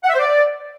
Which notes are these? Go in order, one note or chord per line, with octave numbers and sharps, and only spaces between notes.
F#5
E5
C5
D5